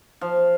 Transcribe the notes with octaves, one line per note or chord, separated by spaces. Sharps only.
F3